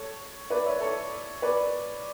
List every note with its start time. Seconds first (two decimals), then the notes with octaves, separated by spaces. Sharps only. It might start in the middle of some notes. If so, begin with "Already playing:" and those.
Already playing: A4 C#5
0.50 B4 D5
0.65 C#5 E5
0.80 A4 C#5
1.42 B4 D5